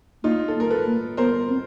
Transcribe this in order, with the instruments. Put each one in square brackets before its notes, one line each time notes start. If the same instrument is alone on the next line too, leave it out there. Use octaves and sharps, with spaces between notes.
[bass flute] A#3 [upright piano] D#4 F4
[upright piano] A4
[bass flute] A#3
[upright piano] A#4
A4 B4
[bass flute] A#3
[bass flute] B3 [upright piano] A#4 C5
[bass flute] C4